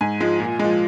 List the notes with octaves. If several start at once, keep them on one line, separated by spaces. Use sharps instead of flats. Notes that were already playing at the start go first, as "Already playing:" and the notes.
G#2 G#5
F3 G#3
A#2
F3 G#3